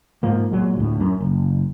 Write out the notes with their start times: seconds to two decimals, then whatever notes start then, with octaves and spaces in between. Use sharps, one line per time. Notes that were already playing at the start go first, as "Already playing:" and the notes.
0.23 G#2 F3 A#3
0.51 A#2 F#3 G#3
0.77 D2 A2
1.00 F#2
1.20 F#1